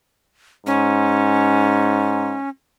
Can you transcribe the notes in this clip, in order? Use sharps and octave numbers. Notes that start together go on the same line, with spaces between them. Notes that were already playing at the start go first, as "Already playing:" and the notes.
G#2 C#4